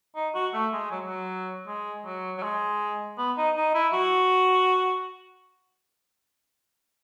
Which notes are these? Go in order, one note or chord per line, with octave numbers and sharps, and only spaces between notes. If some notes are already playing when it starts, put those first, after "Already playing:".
D#4
F#4
A3
G#3
F#3
F#3
G#3
F#3
F#3
G#3
B3
D#4
D#4
E4
F#4